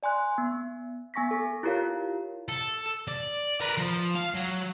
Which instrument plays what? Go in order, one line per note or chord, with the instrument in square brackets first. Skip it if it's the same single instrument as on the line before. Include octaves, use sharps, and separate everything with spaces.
[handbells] D5 G#5 C6 F#6
B3
B3 G#5 C#6 A#6 B6
A4
E4 F4 G4 A#4 C#5 F5
[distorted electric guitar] A4
D5
A#4 B4
F3
F5
F#3